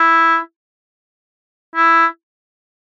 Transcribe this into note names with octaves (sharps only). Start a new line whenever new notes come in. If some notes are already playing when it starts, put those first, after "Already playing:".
Already playing: E4
E4